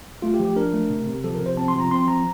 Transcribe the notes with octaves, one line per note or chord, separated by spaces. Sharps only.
A3 F4
G4
F3
G4
D4 A#4
A3
C3
C3
F3 A4
A#4
C3
C5
C4 A5
C6
F3
A#5
C4 C6
F3 A#5